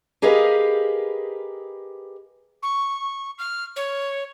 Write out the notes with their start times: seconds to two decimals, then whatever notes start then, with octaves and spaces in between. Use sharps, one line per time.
0.22 G4 G#4 A#4 B4 D#5 F5
2.62 C#6
3.38 F6
3.76 C#5